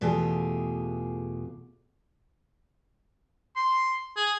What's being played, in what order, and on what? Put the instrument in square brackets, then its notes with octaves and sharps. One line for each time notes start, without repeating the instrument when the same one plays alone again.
[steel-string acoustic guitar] E2 B2 A3 F4 G4 G#4
[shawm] C6
G#4